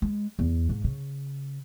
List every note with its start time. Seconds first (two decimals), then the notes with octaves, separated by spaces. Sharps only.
0.02 G#3
0.39 E2
0.69 G#2
0.84 C#3